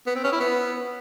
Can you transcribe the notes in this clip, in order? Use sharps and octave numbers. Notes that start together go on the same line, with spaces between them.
B3
C4
C#4
E4
B3